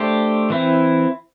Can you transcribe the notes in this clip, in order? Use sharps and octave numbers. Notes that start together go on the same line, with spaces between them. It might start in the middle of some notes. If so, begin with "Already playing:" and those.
Already playing: A3 D4 G4 C5
E3 C4 E4